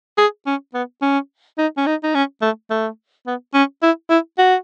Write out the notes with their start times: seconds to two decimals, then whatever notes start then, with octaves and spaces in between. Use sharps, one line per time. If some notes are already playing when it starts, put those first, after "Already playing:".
0.18 G#4
0.46 C#4
0.74 B3
1.02 C#4
1.58 D#4
1.77 C#4
1.87 D#4
2.03 D#4
2.14 C#4
2.42 A3
2.70 A3
3.27 B3
3.54 C#4
3.82 E4
4.10 E4
4.38 F#4